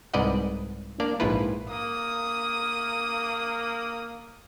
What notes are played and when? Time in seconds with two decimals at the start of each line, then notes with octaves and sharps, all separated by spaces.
0.14 C2 G#2 B4 D5 D#5 F#5
1.00 A#3 D4 D5
1.20 A#1 G#2 E4 F4 B4
1.70 A#3 D#6